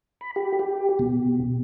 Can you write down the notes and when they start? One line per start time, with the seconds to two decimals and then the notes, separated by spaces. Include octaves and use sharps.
0.21 B5
0.36 G4
0.59 G4
0.99 B2